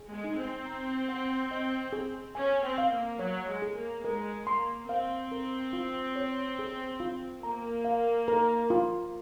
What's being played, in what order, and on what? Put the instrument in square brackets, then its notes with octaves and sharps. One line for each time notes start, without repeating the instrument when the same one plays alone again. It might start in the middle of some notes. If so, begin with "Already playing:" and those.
Already playing: [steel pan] G#4
[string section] G#3
[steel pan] D#4
[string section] C4
[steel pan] A#5
F#5
D#5
G#4
[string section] C#4 [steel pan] G#5
[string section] C4
[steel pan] F5
[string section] A#3
[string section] F#3 [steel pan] C#5
[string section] G#3
[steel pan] G#4
[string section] A#3
[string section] G#3 [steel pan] A#4
[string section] A#3 [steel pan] C6
[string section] C4 [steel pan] F5
[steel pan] A#4
F4
C#5
G#4
F4
[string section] A#3 [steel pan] A#5
[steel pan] F5
A#4
F4